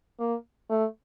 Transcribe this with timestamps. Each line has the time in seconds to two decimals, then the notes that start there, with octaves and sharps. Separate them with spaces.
0.19 A#3
0.69 A3